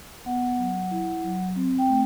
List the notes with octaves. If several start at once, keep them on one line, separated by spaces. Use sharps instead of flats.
B3 F#5
F#3
E4
F#3
C4
G5
A3